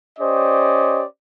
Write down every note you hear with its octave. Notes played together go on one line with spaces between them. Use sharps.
C#4 G4 C5 D5 D#5